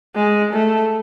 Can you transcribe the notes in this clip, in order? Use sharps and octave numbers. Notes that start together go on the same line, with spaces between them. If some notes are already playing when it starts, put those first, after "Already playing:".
G#3
A3